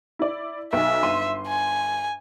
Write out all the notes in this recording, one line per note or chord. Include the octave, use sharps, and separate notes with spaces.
E4 D5
B1 E5 G#5
G1 C6 D#7
G#5